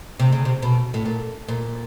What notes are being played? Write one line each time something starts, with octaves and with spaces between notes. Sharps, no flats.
C3
C#3
C3
B2
A2
A#2
A#2